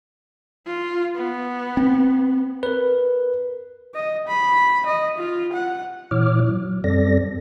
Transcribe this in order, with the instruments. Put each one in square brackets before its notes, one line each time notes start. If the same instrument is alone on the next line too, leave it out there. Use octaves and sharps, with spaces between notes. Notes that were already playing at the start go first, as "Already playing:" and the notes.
[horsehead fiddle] F4
B3
[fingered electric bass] C4
[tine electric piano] A#4 B4
[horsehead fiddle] D#5
B5
D#5
F4
F#5
[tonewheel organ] A#2 E3 E4 C#5 D6 F6
F#3
F#2 G3 C4 A4 D5 A#6